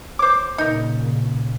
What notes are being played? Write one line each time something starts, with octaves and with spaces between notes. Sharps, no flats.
C5 C#5 D6
A#2 C#3 D#4 A#4